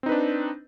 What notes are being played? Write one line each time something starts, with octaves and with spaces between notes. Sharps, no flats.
C4 D4 D#4 B4